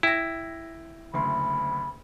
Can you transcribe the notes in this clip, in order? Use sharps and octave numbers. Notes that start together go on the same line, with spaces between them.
E4 G5 A#6
F#1 D2 B5 C6